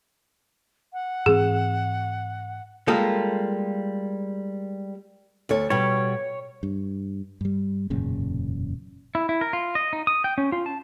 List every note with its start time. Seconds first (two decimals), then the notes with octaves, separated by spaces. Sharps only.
0.93 F#5
1.26 G#2 E3 C4 G#4
2.88 G3 G#3 A#3 F4 A4
5.49 D2 A4 C#5
5.70 B2 G3 C#5
6.63 G2
7.41 G2 G3
7.90 E1 F#2 A#2 C#3
9.15 E4
9.29 E4
9.41 A#4
9.53 F4
9.75 D#5
9.93 D#4
10.07 D#6
10.24 G5
10.38 C#4
10.52 F4
10.66 A5